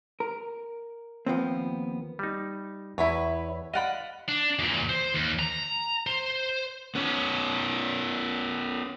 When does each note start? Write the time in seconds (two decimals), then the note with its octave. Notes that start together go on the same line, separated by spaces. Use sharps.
0.20 A#4
1.26 D#2 F3 B3 C4
2.19 G3 D#4
2.98 E2 E4 B4 C#5
3.74 D5 D#5 F5 F#5 B5
4.28 D4
4.59 E2 A#2
4.89 C5
5.14 D#2
5.39 A#5
6.07 C5
6.95 B3 C#4